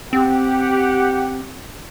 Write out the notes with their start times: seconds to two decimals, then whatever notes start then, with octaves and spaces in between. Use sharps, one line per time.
0.13 C4 G4 F#5